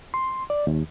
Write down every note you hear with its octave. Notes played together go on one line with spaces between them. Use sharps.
C6
D5
D#2